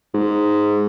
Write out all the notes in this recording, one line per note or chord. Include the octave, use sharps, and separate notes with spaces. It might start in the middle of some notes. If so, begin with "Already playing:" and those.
G#2